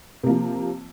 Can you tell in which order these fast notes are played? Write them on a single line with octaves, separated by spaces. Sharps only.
C3 A#3 F3